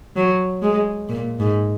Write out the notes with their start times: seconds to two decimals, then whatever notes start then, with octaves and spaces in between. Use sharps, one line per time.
0.16 F#3
0.62 G#3
1.09 A#2
1.40 G#2